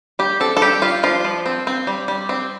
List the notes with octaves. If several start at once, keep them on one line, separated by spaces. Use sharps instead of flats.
G3 G4
C4 A4
A4
G3 G4
G3 F4
F3 F4
F3
C4
C4
G3
G3
C4